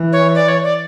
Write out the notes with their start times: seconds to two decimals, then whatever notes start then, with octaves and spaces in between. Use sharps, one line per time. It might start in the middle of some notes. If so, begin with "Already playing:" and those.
Already playing: E3
0.12 C#5
0.35 D5
0.48 C#5
0.64 D5